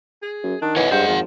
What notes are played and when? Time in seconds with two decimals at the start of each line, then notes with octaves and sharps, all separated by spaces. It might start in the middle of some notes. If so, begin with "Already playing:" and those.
0.23 G#4
0.44 F#2
0.62 D#3 D4
0.76 E3 C#5 D#5 F#5 G#5
0.91 G2 G#3 G#4 C5 F#5
1.08 G#1 F3